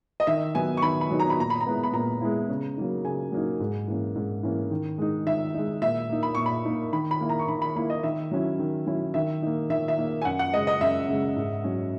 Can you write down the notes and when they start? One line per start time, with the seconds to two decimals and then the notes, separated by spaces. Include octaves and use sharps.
0.20 D#5
0.27 D#3 E5
0.55 F#3 B3 D#4 G#5
0.77 C#6
0.82 D#3 B5
1.01 B5
1.11 F#3 B3 D#4
1.20 A#5
1.30 B5
1.38 A#2 A#5
1.50 B5
1.61 A#5
1.66 G#3 B3 E4
1.83 B5
1.93 A#2 A#5
2.21 G#3 B3 E4
2.49 C#3
2.77 F#3 A#3 D#4
3.04 C#3 G#5
3.32 F#3 A#3 D#4
3.60 G#2
3.88 E3 A#3 C#4
4.16 G#2
4.43 E3 A#3 C#4
4.71 D#3
4.98 G#3 D#4
5.26 D#3 E5
5.54 G#3 D#4
5.82 A#2 E5
6.09 A#3 D#4
6.23 B5
6.35 A#2 C#6
6.46 B5
6.65 A#3 D#4
6.93 D#3 B5
7.11 B5
7.21 A#3 E4
7.29 A#5
7.39 C#6
7.48 D#3 B5
7.62 B5
7.76 A#3 E4 B5
7.90 D#5
8.03 D#3 E5
8.31 F#3 C#4 E4
8.59 D#3
8.87 F#3 C#4 E4
9.14 D#3 E5
9.42 A#3 D#4
9.70 D#3 E5
9.88 E5
9.98 A#3 D#4
10.22 G#5
10.25 F#2 F#5
10.39 F#5
10.53 C#3 G#3 D#5
10.67 D#5
10.81 F#2 E5
11.09 C#3 G#3
11.36 G#2
11.64 F#3 C#4